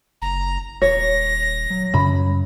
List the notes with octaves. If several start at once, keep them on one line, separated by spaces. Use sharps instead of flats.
F#1 A#5
D#1 C#5 A#6
F#3
F#2 C#3 B5